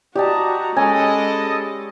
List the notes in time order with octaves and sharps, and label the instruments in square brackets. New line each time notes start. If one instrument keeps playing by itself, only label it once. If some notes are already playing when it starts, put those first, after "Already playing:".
[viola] F#4 A#5 [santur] G4 [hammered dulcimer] D5 D#5 A5
[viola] G#3 [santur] C#4 [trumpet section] A4 D#5 [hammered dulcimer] G#5 B5